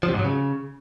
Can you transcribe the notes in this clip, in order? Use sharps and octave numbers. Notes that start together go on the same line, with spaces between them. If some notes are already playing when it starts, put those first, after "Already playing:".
F3
C3
G#2
F#3
C#3